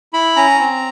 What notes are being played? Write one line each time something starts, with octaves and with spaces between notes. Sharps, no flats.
E4 B5
C#4 A#5
C4